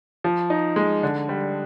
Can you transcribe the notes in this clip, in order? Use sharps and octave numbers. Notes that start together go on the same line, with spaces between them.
F3
D#4
G#3
D3
G3